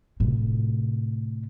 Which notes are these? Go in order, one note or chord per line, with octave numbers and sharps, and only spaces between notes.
A2 C3